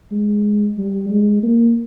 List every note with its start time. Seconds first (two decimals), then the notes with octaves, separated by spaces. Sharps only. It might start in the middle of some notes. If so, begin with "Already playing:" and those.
0.12 G#3
0.78 G3
1.10 G#3
1.43 A#3